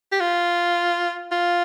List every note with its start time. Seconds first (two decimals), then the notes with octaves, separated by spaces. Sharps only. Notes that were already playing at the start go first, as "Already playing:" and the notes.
0.12 G4
0.20 F4
1.32 F4